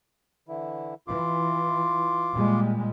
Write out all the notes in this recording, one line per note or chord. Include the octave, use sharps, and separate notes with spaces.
D3 E3 E4
E3 F4 C6 D6
A#2 G3 G#3